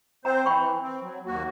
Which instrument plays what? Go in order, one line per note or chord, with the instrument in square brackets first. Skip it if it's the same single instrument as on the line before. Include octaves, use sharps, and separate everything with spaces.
[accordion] C4 C5 [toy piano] G5 A#5
[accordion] E3 [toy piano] G5 B5 C#6
[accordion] C4
F#3
D#2 A#3 F#4